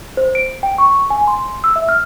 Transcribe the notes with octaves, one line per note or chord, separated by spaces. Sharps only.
C5
D7
G5
C#6
G#5
C6
E6
E5
F6